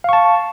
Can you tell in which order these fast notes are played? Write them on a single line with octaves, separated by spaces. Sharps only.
F5 C#6 A5